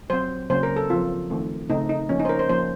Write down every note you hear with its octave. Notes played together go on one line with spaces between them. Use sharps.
F#3 C4 C5
C#3 F#3 A#3 C#4 C5
A#4
A4
F3 C4 F4
D#3 A3 C4
C#3 A3 C4 D#4
D#4
F3 A#3 C#4
D#4
C5
A#4
C5
F3 A#3 C#4 C5